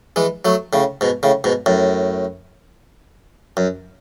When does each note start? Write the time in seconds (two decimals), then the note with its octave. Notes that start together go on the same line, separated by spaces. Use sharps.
0.16 E3 G#3
0.45 F#3 A3
0.73 A2 C#3
1.01 G#2 B2
1.23 A2 C#3
1.44 G#2 B2
1.66 F#2 A2
3.57 F#2